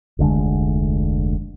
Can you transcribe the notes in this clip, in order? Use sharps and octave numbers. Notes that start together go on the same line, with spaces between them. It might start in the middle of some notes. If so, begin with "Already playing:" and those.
F1 D2 D3 G#3